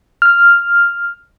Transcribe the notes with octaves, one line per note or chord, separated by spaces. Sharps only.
F6